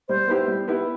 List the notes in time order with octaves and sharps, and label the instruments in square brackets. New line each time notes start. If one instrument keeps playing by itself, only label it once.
[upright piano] G3 [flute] C5
[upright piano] B3 E4 G4
G3
B3 E4 G4